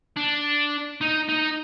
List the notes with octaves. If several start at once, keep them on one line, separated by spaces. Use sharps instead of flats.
D4
D#4
D#4